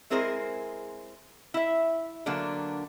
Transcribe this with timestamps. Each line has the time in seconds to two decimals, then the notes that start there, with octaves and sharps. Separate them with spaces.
0.10 G#3 C4 E4 G#4 A#4 C5
1.54 E4 E5
2.26 D3 F#3 A#3 B3 D4